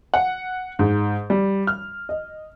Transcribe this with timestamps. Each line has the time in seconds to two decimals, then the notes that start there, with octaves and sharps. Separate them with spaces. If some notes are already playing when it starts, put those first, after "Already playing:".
0.14 F#5
0.79 G#2
1.30 G3
1.67 F6
2.09 D#5